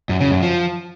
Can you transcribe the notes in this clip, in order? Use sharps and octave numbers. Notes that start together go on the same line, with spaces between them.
F#2
C#3
F#2
F3